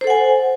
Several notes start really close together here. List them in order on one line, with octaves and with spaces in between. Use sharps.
C5 A4 F#5 G#5